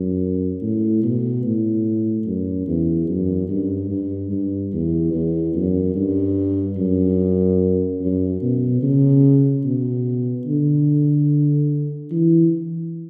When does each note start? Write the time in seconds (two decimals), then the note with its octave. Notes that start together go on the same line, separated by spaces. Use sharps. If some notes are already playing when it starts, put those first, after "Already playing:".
Already playing: F#2
0.62 A2
1.03 B2
1.45 A2
2.27 F#2
2.67 E2
3.08 F#2
3.49 G2
3.90 G2
4.31 G2
4.73 E2
5.13 E2
5.55 F#2
5.96 G2
6.78 F#2
8.01 F#2
8.42 B2
8.83 C#3
9.65 B2
10.47 D3
12.11 E3